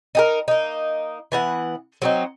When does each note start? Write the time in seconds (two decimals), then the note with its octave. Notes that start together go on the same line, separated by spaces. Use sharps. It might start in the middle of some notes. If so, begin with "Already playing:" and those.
0.15 D#4 G4 A#4
0.48 A#3 D#4
1.32 E3 B3 F#5
2.02 F#3 C4 D#4